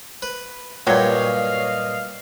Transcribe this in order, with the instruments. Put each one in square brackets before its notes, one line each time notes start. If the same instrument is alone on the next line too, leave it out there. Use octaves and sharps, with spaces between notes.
[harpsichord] B4
[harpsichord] G2 A#2 [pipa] F#3 F4 G4 [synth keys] C#5 [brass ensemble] D#5 F5